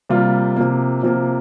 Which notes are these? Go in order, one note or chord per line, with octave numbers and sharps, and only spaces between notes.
C3 G3 A#3 F4
C3 F3 A#3
C3 F3 A#3